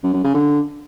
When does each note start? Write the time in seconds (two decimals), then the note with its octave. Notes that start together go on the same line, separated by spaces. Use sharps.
0.03 F#2
0.14 F#2
0.24 C#3
0.34 D3